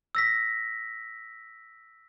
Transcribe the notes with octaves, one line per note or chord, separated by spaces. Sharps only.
E6 A#6 B6